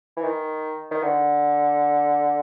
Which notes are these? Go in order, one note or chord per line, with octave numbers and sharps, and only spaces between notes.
E3
D#3
D#3
D3